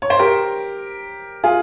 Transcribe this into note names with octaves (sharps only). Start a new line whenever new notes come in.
C#5
C5
G4 A#4
F4 G#4